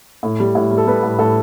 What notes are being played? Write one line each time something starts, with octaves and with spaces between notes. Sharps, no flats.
A2
G3
A2
G3
A4
G3 B4
A2
A2 A4